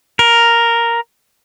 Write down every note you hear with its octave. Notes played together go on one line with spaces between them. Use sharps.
A#4